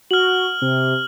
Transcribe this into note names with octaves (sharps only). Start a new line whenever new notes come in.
F#4 F6 F#7
C3